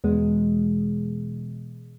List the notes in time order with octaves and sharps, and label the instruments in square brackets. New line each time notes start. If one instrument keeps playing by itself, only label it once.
[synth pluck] E2 B2 G#3